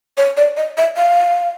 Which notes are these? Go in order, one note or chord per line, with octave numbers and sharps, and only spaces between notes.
C#5
D5
D#5
E5
F5